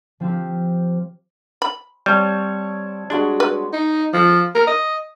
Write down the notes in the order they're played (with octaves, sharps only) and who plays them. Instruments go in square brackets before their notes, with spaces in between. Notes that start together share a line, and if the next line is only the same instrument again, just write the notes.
[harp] F3 C4 F4 G4
[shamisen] B5
[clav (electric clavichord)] G3 [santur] C4 C#5 A5
[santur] G3 G#3 F#4 [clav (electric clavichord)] D4
[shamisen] B4
[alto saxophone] D#4
F3
A#4
D#5